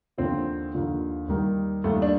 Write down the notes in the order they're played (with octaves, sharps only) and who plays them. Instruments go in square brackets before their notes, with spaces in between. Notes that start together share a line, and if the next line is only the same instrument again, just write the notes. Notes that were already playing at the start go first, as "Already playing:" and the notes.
[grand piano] D#2 D3 F3 [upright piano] C4
[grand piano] D#2 D3 F3
D#2 D#3 G3
[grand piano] D#2 D#3 G3 [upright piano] A3
[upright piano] D4